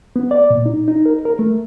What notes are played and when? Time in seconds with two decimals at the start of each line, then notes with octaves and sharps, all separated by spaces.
0.16 B3
0.31 D5
0.50 A#2
0.66 D#4
0.88 D#4
1.06 A#4
1.25 A#4
1.39 A3